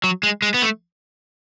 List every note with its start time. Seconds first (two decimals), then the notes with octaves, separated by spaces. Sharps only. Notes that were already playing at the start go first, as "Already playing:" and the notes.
0.04 F#3
0.23 G#3
0.42 G#3
0.54 B3
0.62 A3